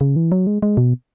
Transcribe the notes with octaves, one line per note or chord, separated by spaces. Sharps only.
C#3
E3
F#3
G#3
G#3
B2